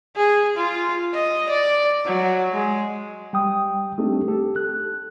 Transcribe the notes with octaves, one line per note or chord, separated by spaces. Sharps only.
G#4
F4
D#5
D5
F#3
G#3
G3 G5 D#6
A3 C4 D4 D#4 G4 A4
G4 A4
F#6